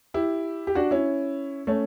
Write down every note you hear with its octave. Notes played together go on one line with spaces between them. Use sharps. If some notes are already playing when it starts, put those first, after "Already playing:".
E4 G4
G4
D4 F#4
C#4 E4
A3 C#4